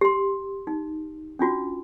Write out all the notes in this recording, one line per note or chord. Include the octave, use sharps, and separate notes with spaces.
G4 C6
D#4
C#4 D4 F4 F#4